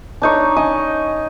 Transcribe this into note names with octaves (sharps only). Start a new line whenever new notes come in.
D4 D#4 C#5
C#4 D#5 D#6